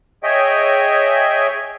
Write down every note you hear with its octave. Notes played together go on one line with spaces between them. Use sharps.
G#4 C#5 D#5 E5 G5 G#5